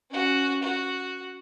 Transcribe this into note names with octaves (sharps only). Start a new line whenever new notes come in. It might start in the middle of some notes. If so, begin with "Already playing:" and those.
C#4 F#4
F#4